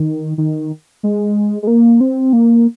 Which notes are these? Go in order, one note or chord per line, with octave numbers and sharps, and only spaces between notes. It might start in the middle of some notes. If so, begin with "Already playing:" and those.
Already playing: D#3
D#3
G#3
G#3
A#3
C4
A#3